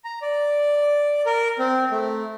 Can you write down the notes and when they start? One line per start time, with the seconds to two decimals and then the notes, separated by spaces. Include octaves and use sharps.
0.04 A#5
0.22 D5
1.26 A#4
1.59 C4
1.91 A3